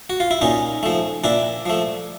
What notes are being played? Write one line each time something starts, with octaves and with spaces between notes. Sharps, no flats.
F#4
F4
E4
A#2 C#4 D#4
F3 A3
A#2 D4 E4
F3 A3